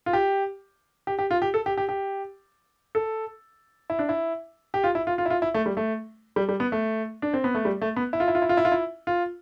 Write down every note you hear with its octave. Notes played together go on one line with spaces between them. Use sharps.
F4
G4
G4
G4
F4
G4
A4
G4
G4
G4
A4
E4
D4
E4
G4
F4
E4
F4
F4
E4
F4
E4
A3
G3
A3
G3
G3
B3
A3
D4
C4
B3
A3
G3
A3
B3
E4
F4
E4
F4
E4
F4
E4
F4
E4
F4